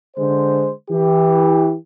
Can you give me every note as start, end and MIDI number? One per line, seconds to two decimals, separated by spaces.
0.17 0.71 50
0.17 0.71 56
0.17 0.71 72
0.91 1.74 52
0.91 1.74 67